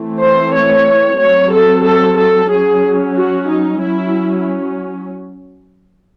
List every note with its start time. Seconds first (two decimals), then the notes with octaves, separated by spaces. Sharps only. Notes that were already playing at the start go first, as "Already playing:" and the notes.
Already playing: E3 A3 C4
0.21 C5
0.54 C#5
1.19 F#3 C4 C#5
1.52 A4
1.85 A4
2.18 A4
2.50 F#3 C#4 G#4
3.16 F#4
3.48 D#4
3.81 F#3 C#4 E4